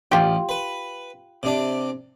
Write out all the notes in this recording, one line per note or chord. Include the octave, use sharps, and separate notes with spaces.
A1 F4 G4
B4
C3 D4